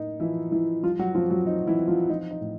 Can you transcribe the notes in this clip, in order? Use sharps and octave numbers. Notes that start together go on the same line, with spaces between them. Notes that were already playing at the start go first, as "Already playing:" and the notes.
Already playing: A2 A#3 D#4
E3 F3 E4
E3 F3 E4
F3 G3 F4
F#3 F#4
F3 C4 F4
F#3 F#4
C4 D#4
E3 E4
C4
F3 F4
F3 D#4
D#4
A2